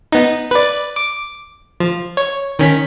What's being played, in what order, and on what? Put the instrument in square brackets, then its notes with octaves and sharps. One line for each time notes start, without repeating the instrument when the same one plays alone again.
[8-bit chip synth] B3 D#4
B4 D5
D6
F3
C#5
D#3 C#4 B6